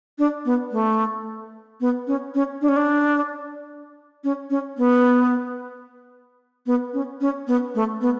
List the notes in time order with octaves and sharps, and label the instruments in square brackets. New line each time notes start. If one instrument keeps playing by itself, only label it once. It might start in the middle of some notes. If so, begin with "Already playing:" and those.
[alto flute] D4
B3
A3
B3
C#4
C#4
D4
C#4
D4
C#4
C#4
B3
B3
C#4
C#4
B3
A3
B3